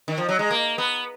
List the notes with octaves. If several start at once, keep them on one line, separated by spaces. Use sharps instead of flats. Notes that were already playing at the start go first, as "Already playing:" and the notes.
D#3
F3
F#3
G#3
A#3
B3